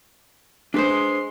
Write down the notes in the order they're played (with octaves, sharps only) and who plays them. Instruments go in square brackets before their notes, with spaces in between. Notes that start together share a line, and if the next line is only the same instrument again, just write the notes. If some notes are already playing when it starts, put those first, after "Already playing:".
[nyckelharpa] G#3 C6 [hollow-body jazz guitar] D4 B4 C5